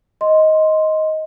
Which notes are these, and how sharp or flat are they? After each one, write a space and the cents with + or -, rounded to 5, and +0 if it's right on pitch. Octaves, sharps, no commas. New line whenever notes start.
D#5 +10 C6 +0